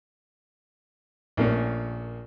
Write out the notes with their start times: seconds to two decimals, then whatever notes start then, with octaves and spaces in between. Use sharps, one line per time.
1.37 A#1 A2 A#3 C#4 A#4